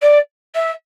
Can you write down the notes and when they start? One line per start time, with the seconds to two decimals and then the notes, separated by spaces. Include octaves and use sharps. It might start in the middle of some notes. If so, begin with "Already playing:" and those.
0.02 D5
0.55 E5